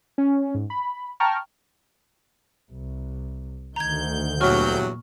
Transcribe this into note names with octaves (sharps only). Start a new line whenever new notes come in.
C#4
G#2
B5
G5 A5 A#5 C#6 F6
C2
D2 D#3 A#5 G6 G#6
E2 G2 A#2 F#3 C#6 F6